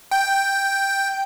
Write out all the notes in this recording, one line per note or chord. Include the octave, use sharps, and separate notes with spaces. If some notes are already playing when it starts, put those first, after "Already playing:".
G5